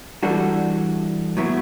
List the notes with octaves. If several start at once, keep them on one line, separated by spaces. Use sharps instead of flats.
E3 G3 D4 F#4 A4
A2 F#3 B3 E4